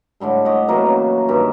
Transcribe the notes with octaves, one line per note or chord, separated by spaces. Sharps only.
A2 D3 G3 G#3
G4 C#5 D#5 F#5
E3 F#3 A#3 C4
C#3
G2 D#3 G4